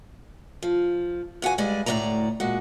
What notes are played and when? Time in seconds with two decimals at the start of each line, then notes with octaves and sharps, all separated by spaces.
0.63 F3
1.42 E2 F#4 F5 G#5
1.58 G2 G3 G#3 D5 G#5
1.86 D2 A2 D#3 A3 D5 A#5
2.40 A#2 G#3 F#4